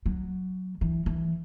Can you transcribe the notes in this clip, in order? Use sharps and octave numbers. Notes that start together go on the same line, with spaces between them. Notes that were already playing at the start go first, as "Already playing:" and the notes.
F#3
E3
E3